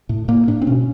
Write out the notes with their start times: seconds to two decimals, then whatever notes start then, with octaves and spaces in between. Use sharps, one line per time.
0.09 A2
0.28 A2 A#3
0.48 A2 D4
0.62 C4
0.67 B2 C#4